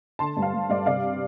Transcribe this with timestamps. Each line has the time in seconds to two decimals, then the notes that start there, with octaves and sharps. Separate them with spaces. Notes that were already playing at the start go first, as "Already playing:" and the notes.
0.19 D3 A5 C6
0.37 G2
0.42 F5 A5
0.54 G2
0.69 G2 D5 F5
0.86 C3 D5 F5